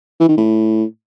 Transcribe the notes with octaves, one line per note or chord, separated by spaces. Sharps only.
E3
D#3
A2